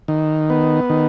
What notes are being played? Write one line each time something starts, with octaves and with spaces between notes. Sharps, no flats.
D#3
B3
D#3